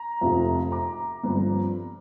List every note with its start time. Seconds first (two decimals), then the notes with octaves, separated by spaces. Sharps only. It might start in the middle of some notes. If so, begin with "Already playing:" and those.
Already playing: A#5
0.21 F1 F2 C3
0.72 A#5 D6
1.23 G1 G2 F3 C4